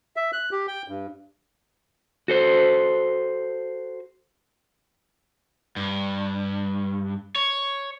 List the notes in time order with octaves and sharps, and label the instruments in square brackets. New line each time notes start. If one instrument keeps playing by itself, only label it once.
[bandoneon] E5
F#6
G4
G5
G2
[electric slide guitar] F#4 A4 C5
[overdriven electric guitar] G2
C#5